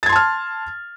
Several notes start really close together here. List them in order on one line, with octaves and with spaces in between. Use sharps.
A6 G#6 C6 A5 F6